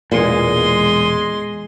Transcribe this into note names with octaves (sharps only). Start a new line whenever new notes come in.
E1 E2 A#2 G#3 C6